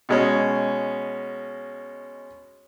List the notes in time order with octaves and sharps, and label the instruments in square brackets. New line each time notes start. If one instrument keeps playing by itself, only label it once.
[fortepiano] B2 G#3 C#4